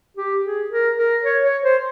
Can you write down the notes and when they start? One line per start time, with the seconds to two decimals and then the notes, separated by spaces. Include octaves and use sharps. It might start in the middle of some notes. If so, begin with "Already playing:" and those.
0.17 G4
0.44 G#4
0.71 A#4
0.97 A#4
1.24 C#5
1.44 C#5
1.63 C5